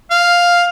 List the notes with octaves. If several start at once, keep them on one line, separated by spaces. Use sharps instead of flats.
F5